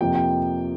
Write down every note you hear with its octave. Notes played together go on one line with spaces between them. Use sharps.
F2 C3 F3 A#3 G5
G5